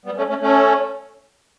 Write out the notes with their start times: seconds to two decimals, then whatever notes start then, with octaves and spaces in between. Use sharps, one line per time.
0.06 G3 B3
0.17 A3 C#4
0.29 A3 C#4
0.41 A3 C#4